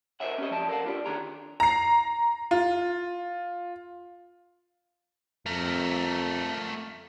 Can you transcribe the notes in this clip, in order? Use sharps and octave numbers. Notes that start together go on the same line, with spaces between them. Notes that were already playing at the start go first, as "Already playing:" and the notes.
A#4 C5 C#5 D#5 E5 F#5
C#4 G4 D#5
F#2 F3 D5 A5
A4 A#4 C#5 F5 F#5
D4 F4 G4 C#5 D5
D#3 D4 G#4 A4 A#5
A#5 C7
F4
F2 A3 A#4